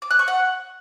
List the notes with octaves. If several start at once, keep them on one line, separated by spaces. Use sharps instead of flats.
D6
F#6
C#6
F#5